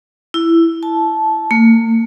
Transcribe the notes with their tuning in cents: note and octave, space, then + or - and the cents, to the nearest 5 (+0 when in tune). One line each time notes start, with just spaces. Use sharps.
E4 +10
A5 -15
A#3 -45